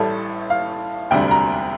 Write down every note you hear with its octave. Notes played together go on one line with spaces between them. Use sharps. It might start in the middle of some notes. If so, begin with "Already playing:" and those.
Already playing: A1 A2 G3 A4
F5
E1 D2 C3 G3 D4 G5
A#5